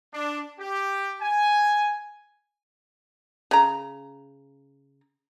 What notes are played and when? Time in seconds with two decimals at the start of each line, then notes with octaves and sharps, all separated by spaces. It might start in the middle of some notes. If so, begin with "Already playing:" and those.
0.13 D4
0.60 G4
1.21 G#5
3.51 C#3 A#5